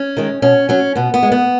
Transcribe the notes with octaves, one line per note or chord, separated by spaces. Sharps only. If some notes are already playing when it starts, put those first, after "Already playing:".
Already playing: C#4
D#3 G#3
B2 C#4
F#3 C#4
B2 B3
B3
G#3
B3